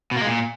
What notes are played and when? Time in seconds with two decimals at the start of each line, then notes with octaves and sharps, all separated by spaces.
0.11 B2
0.16 A#3
0.21 G#3
0.27 A#2